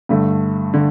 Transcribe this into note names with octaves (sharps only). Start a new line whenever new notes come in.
G2 D3 A3
D3